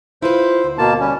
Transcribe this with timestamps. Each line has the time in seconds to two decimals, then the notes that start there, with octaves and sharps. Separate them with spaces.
0.22 E4 F4 B4 C5
0.64 D2
0.78 B2 A#3 A5
1.00 G3 C#4